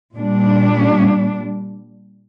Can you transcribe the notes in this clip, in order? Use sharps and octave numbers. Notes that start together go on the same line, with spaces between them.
A#2 G3 D4